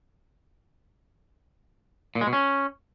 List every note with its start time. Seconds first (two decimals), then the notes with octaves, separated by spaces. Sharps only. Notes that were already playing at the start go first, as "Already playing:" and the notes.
2.15 A#2
2.21 G#3
2.27 B2
2.33 C#4